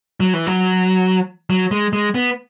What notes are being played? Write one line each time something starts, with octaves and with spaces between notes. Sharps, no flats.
F#3
E3
F#3
F#3
G#3
G#3
B3